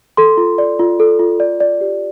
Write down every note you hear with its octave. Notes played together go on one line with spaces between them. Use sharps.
A4 C6
F4
D5
F4
A4
F4
D5
D5
G4